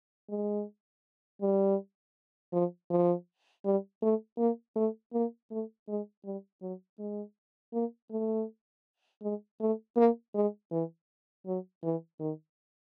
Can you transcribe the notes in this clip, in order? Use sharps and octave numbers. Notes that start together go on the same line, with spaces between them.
G#3
G3
F3
F3
G3
A3
A#3
A3
A#3
A3
G#3
G3
F#3
G#3
A#3
A3
G#3
A3
A#3
G#3
E3
F#3
E3
D#3